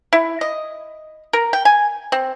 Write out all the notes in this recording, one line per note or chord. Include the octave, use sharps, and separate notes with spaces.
E4
D#5
A#4
G5
G#5
C4